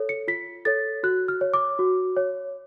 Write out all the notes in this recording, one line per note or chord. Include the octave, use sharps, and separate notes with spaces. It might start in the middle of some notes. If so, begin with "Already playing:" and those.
Already playing: A4 C#5
C#7
F4 B6
A4 C#5 A6
F#4 F#6
F6
C#5
D6
F#4
C#5